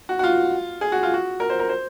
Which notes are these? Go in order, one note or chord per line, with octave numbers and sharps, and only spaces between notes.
F#4
F#4
F4
G#4
F#4
F4
F#4
A#4
C5
A#4
C5